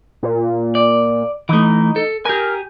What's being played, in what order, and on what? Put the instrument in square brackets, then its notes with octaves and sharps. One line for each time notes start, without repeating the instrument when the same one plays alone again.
[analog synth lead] A#2
[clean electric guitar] D5
[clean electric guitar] E3 A3 [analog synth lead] D#4
[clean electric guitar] A4
[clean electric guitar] G4 G#5 [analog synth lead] A#4